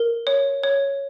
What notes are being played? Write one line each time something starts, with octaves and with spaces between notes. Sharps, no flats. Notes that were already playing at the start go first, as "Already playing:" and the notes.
Already playing: A#4
C#5
C#5